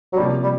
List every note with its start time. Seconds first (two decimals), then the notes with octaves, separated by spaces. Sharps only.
0.12 F#3
0.16 C3 F3 G3 A#3 C#4
0.44 G3